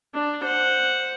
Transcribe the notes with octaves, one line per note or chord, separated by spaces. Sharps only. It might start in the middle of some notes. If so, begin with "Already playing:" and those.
D4
C5 F#5